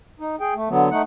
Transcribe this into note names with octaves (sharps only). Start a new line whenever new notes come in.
D#4
G#4 G5
A3
D3 F#3 B3
A3 D#4 F#5